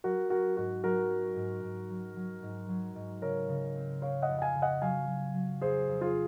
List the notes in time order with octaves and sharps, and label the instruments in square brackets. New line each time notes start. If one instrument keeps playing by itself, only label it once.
[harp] F#3 [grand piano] F#4 A#4
[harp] C#4 [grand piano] F#4 A#4
[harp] G#2 [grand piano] F#4
[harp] F#3 [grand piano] F#4 A#4
[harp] C#4
G#2
G#2
F#3
F#3
G#2
F#3
G#2
[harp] C#3 [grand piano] A#4 C#5
[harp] C#3
C4
[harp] C4 [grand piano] C#5 F5
[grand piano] D#5 F#5
[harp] F2
[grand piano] F#5
F5 G#5
[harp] C#3
[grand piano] D#5 F#5
[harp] F#3 [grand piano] F5 G#5
[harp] F#3
F#3
[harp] F2 [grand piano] G#4 C5
[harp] F2
[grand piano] F4 G#4